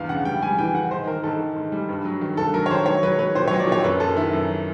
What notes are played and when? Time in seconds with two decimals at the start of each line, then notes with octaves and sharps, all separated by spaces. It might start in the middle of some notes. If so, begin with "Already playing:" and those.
Already playing: E2 G2 F5
0.09 C#3 F#5
0.25 G3 G5
0.42 G3 G#5
0.58 E3 G5
0.74 E3 F#5
0.91 G#2 C5
1.07 D#3 A#4
1.23 G#2 A4
1.40 D#3
1.56 G#2
1.72 G3
1.89 G2
2.05 F#3
2.21 D#3
2.37 G2 A4
2.54 F#3 A#4
2.66 C#5
2.70 D#3 C5
2.86 F#3 C#5
3.03 F#3 B4
3.19 F#3 B4
3.35 A#2 C5
3.48 F#3 C#5
3.60 D5
3.67 A#2 C#5
3.84 F#2 B4
4.00 F#2 A4
4.17 D#3 E4
4.33 F#2